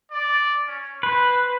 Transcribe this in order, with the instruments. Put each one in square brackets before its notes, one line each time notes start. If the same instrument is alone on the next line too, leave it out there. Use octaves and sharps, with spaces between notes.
[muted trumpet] D5
C#4
[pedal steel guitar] B4 [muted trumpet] C5